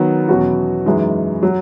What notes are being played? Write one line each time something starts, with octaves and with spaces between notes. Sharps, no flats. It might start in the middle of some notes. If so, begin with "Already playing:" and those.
Already playing: D#3 F#3 B3
E2 B2 F#3 C#4 F#4
F#2 E3 G#3 D#4
F#3